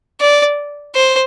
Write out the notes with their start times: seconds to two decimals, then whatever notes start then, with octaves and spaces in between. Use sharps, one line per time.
0.21 D5
0.95 C5